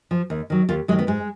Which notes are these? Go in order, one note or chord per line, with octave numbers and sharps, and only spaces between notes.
F3
D#2
D#3 F#3
D#2 F4
D#3 F#3 G#3
B3
G#2 G#3